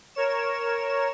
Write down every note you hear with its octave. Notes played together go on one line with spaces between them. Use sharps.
A#4 C#5 E7